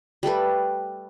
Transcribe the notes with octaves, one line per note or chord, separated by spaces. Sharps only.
G3 A3 A4 B4